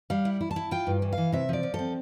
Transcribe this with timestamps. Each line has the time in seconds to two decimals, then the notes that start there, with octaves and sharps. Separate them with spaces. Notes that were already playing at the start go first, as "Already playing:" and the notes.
0.10 G3 F5
0.25 E4
0.41 E4
0.51 A5
0.56 E4
0.71 F4 G5
0.87 G2
1.02 E3
1.13 F5
1.18 E3
1.32 C3 E5
1.49 F3 D5
1.63 F3
1.74 A4
1.79 C4